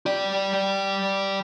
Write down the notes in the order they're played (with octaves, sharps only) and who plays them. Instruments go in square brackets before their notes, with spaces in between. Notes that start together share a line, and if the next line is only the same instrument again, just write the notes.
[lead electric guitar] G4 D5